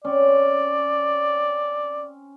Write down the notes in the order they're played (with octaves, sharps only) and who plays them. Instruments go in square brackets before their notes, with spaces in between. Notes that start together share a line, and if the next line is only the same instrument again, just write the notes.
[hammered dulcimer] C4 C#4 [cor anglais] D5